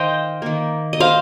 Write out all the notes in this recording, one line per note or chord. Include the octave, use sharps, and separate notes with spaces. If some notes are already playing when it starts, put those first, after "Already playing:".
Already playing: D#3 C5 D#5 F5 G5
D#3 A#3
D#5
C5 F5